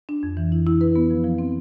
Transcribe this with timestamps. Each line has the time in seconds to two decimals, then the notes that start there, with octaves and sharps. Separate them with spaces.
0.09 D4
0.23 F2
0.37 E3
0.52 E4
0.67 E4
0.81 B4
0.96 B3
1.10 F3
1.24 F3
1.38 C4